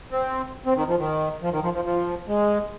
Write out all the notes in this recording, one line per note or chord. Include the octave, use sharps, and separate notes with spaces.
C4
C4
D#3
F3
D#3
F3
D#3
F3
F3
F3
G#3